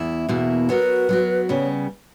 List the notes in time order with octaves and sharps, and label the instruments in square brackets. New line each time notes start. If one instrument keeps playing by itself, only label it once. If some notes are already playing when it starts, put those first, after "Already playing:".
Already playing: [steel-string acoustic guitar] E2 E4
E2 B2 A#3 E4
[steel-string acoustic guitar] F#3 B3 F#4 A#4 [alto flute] B4
[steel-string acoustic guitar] F#3 B3 F#4 A#4
[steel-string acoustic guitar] C#3 G3 B3 [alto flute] C#5